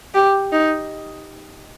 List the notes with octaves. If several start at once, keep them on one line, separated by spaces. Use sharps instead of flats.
G4
D#4